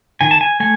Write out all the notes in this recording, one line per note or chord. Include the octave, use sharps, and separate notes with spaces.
D#3 G#5
A5
G#5
A3 G#5